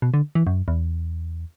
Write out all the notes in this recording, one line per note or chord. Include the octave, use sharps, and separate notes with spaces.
B2
D3
E3
F#2
E2